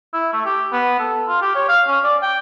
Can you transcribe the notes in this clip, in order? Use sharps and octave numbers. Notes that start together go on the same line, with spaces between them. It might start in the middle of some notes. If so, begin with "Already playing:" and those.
E4
A3
G4
B3
A4
F4
G4
C#5
F5
C#4
D5
G5